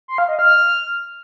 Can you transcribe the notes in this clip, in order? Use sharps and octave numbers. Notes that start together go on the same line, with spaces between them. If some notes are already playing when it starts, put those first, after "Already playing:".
C6
F5
D#5
F6